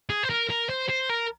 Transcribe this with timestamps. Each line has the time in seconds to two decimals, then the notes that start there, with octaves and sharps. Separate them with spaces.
0.10 G#4
0.23 C5
0.30 A#4
0.50 A#4
0.70 C5
0.89 C5
1.10 A#4